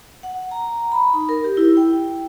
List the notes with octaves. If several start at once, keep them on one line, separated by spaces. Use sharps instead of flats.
F#5
A#5
B5
D#4
A#4
G4
E4
G5